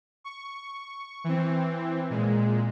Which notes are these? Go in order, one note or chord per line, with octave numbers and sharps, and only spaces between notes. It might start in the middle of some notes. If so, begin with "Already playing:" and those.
C#6
E3 C4
A#2 G#3